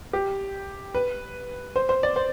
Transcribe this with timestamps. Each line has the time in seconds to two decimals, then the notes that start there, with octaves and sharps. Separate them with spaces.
0.13 G4
0.94 B4
1.76 C5
1.89 C5
2.03 D5
2.16 C5